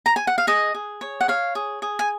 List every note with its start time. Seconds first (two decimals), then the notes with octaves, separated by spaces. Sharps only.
0.06 A#5
0.16 G#5
0.27 F#5
0.38 F5
0.47 G#4 D#5
0.75 G#4
1.01 C#5
1.21 F#5
1.28 C#5 F5
1.55 G#4
1.82 G#4
1.99 G#5